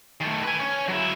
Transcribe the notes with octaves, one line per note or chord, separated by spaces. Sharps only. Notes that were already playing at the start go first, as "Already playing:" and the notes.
D#3 A3
B4 G#5
C#4
F#3 E4